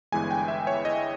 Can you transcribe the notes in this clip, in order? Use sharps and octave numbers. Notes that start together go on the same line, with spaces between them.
G1 G2 E3 G#3 B3 G#5
G5
E5
C#5
D#5